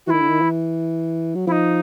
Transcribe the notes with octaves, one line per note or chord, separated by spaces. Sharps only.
E3 F#4
D#3 E4
D3
D#3
E3
F#3
F3 D#4 E4